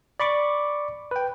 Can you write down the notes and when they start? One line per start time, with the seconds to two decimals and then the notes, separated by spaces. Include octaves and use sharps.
0.20 D5 B5 C#6 D6
1.11 B4 G5